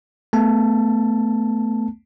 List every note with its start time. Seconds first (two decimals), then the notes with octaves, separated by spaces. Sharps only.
0.33 A3 B3 A5